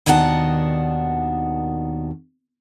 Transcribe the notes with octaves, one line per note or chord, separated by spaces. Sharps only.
D#2 B2 D#3 D4 F#5 A5